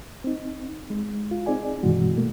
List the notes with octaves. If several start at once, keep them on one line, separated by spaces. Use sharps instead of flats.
C4 D#4
G#3
F4
C4 D#4 G#4 D5 G#5
G2 B2 D#3 E3 G#3 F#4
B2 A3 A#3